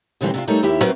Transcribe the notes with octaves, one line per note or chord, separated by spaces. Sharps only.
D#2 B2 D3 E3 G3 C4
C3 D4 F4
G3 A3 D#4 A4 A#4 C#5
D#2 E4 G4 E5
F#3 A3 C4 A#4 B4